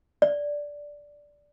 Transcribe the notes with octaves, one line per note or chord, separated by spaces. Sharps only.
D5